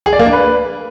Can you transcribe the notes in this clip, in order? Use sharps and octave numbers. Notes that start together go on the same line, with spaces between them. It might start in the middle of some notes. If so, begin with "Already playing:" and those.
G#4
D5
A#3
D4
B4